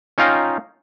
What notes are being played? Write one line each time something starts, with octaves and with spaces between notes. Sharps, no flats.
C#4 D#4 F4 F5 G5 A#5